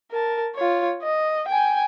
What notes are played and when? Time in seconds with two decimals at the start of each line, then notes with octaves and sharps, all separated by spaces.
0.12 A#4 A5
0.55 F4 C#5
1.03 D#5
1.48 G5 G#5